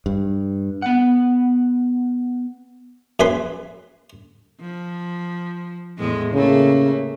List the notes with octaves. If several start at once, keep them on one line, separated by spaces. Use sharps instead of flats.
G2
B3 F#5
F#2 G#4 B4 B5 C6
F3
E2 A2 G#3
C#3 A3 A#3